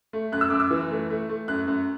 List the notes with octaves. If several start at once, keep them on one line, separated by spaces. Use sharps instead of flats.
A3
F#2 F#6
E6
F#2 D6
E6
E3
A3
A3
A3
F#2 F#6
F#2